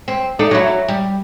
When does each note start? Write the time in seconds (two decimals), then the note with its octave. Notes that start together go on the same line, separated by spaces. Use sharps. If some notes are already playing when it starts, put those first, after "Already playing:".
0.08 C4
0.39 D4 D#4 A4
0.51 F#3 E4
0.88 G3